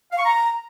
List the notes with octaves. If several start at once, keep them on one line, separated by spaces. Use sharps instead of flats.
F5
C#6
A#5